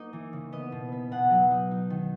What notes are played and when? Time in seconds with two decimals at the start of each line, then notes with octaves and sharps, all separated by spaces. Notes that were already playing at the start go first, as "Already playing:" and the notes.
Already playing: A#3 D#4 D#5
0.13 E3
0.33 C#3
0.52 B3 D#5
0.72 B2
0.92 B3
1.12 B2 F#5
1.31 F#3
1.51 D#4
1.71 D#4
1.90 D#3